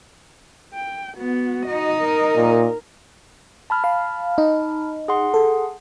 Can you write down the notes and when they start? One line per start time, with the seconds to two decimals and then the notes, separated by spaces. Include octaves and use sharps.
0.74 G5
1.18 B3 F#4
1.68 D#4 D#5
2.02 A#4
2.36 A#2
3.70 A5 B5 F6
3.84 F5
4.38 D#4
5.08 G#4 F#5 C6
5.34 A4